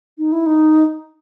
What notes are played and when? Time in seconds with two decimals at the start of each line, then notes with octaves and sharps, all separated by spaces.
0.18 D#4
0.32 E4
0.46 D#4